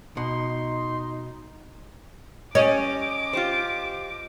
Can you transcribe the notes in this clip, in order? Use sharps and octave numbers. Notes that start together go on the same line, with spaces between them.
B2 D#4 C6
G3 C#4 D#5 D6
F4 G4 C5